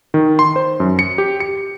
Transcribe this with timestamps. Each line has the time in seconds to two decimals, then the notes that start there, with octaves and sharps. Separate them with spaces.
0.14 D#3
0.39 C6
0.56 C5
0.80 F#2
0.99 C#7
1.18 G4
1.40 C#7